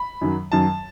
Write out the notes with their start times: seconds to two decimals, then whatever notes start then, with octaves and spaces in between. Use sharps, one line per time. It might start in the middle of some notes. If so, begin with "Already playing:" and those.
Already playing: B5
0.21 F#2 D#3 F#3
0.52 F#2 D#3 F#3 A5